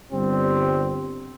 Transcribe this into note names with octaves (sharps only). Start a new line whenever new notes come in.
G1 G3 C4